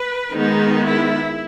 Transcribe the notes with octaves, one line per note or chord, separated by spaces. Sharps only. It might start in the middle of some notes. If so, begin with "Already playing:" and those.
Already playing: B4
D#3 G#3 B3 D#4
E4